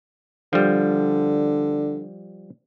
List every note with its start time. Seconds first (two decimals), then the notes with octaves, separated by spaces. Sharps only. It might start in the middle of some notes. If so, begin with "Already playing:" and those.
0.53 D3 F3 G3